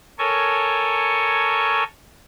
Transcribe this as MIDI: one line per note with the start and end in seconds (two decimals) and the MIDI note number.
0.19 1.84 69
0.19 1.84 70
0.19 1.84 73
0.19 1.84 80
0.19 1.84 85